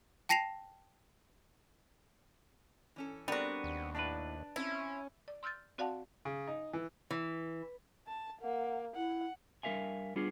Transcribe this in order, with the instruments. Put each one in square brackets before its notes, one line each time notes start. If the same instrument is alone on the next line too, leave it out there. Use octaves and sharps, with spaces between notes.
[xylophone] G5 A5 A#6 C7 E7 F7
[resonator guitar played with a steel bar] E3 C#4 A4
[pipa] G3 F#4 [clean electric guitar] B3 C4 [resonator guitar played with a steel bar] D4 A#4
[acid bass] D#2
[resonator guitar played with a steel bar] A2 E4 D5 [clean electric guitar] D4 B4
[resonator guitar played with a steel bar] C4 E5 [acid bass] C#4 [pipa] E4
[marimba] D5
C6 E6 F6 G6 A6
C4 F#4 D5 F5 F#5 A5
[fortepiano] C#3
D#4
E3
[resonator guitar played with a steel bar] E3
[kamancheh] A5
[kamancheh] A#3 [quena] F#5
[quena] E4 [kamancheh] F#5
[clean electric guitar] G2 B3 A#4 E5 F5 G#5
G3 B3 D4 F4 G#4